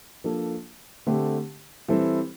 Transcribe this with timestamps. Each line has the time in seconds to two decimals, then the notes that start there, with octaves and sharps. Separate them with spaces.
0.24 F3 A#3 D4 A4
1.07 D3 A3 C4 G4
1.88 E3 G3 C4 E4 A4